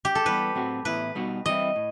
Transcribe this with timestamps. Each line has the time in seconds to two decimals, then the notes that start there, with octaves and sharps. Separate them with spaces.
0.05 G4
0.15 A4
0.25 E3 G3 B3 B4
0.55 A2 F#3 C4 F#4
0.85 A2 E3 B3 E4 B4
1.15 B2 G3 B3 D#4 F#4
1.46 E3 G3 C4 E4 D#5
1.76 A2